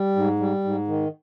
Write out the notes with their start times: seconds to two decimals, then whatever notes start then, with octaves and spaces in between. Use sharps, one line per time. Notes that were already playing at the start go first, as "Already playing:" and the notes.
Already playing: G3
0.16 G#2
0.40 G3
0.65 G#2
0.88 D#3